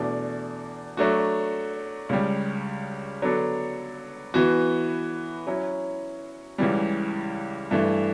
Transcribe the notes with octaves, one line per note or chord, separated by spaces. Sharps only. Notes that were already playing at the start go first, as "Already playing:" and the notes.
Already playing: E2 B2 A3 D4
F#3 A3 D4 F#4
C#2 C#3 G3
D3 F#3 B3 D4 A4
E3 B3 F#4
F#3 C#4 E4
C#2 C#3 E3 G3
G2 E3 A3